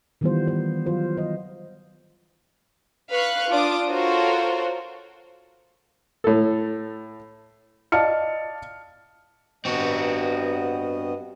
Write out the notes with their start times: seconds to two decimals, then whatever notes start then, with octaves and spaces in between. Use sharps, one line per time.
0.21 D#3 E3 G3 B3 F4 C5
0.48 C5
0.86 F#3 F4 C5
1.17 C5 D#5
3.11 B4 F5 C#6 F#6
3.50 D4 F4 A5 D6 D#6
3.88 F4 F#4 A4 A#4 C5 C#5
6.24 A2 A4
7.92 D5 D#5 F5 A5 F6 C#7
9.65 G2 B3 C4 F#4 D#5